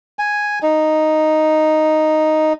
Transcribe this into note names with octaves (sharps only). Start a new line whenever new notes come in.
G#5
D#4